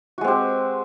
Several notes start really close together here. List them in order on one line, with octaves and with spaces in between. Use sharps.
F#4 G#3 C4 G4